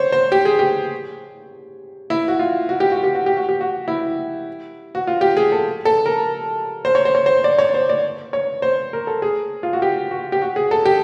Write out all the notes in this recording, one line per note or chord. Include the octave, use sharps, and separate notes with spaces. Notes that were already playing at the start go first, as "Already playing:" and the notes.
Already playing: C5 C#5
C5
G4
G#4
G4
E4
F#4
F4
F#4
G4
F#4
G4
F#4
G4
F#4
G4
F#4
E4
F#4
F4
G4
G#4
A4
A4
A#4
C5
C#5
C5
C#5
C5
D5
C#5
C5
D5
C#5
C5
A#4
A4
G#4
F4
F#4
G4
F#4
G4
F#4
G#4
A4
G4